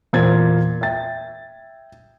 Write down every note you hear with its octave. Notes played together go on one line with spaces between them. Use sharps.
E2 A#2 A#3 C5 G#6 A6
E5 G5 A6